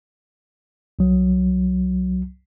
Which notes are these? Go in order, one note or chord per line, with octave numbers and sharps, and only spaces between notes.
C2 F#3